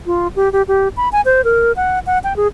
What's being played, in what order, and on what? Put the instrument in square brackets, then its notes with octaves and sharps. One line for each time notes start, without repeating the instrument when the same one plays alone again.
[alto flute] F4
G4
G4
G4
B5
G#5
C5
A#4
F#5
F#5
G5
G#4